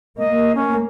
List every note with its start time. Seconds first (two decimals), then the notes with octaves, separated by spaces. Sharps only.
0.18 A#3 D#5
0.55 C#4